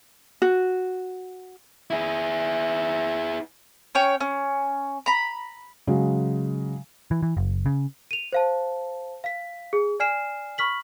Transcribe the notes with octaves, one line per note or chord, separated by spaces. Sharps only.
F#4
E4 G#4
C#4 C#5 G5
C#4
A#5 B5
C#3 F#3 G#3
E3
E3
F#1
C#3
D#7 F7
C5 F5 A5
F5 B6
G#4
D5 G#5 F6 C7 E7
B5 C#6 F6 B6 F#7